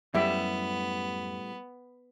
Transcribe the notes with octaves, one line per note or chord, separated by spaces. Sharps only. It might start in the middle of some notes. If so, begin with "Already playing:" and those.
F#2 A2 G3 B3 G4 E5